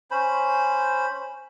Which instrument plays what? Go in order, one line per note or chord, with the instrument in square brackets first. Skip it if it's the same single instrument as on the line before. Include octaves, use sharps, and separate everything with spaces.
[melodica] C#4 C5 B5